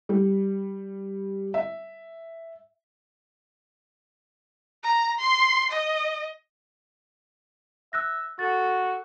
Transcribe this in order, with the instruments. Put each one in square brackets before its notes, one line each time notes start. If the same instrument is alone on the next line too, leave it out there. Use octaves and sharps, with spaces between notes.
[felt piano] G3
E5
[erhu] A#5
C6
D#5
[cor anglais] E5 [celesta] E6 F#6 A#6
[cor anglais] F#4 [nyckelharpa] A4 [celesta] A6